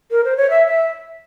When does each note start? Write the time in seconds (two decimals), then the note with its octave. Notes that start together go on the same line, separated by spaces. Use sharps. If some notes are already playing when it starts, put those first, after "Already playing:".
0.11 A#4
0.24 C5
0.37 C#5
0.50 E5
0.67 E5